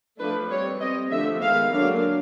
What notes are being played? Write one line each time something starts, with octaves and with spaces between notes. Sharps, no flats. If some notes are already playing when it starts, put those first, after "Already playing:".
F3 A3 D4 B4
G3 C4 C#5
G3 C4 D#5
D3 F3 A3 E5
D#3 G#3 B3 F5
D3 F#3 A#3 D4 F5